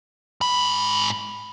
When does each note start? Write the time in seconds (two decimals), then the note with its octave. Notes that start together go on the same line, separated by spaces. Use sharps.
0.41 G#2 B5